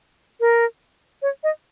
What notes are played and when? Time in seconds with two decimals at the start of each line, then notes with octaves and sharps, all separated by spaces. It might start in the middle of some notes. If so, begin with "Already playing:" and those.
0.40 A#4
1.22 C#5
1.44 D#5